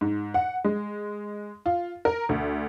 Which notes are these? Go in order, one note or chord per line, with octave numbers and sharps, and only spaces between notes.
G#2
F#5
G#3
F4
A#4
D2